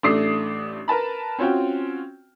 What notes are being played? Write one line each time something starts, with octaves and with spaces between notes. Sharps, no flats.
A1 A3 D4 D6 D#6 C7
A#4 B4 A5 B5
C4 C#4 F4 F#4 G5